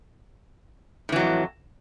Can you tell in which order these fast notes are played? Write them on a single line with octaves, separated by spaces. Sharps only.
A2 E3 F#3 F2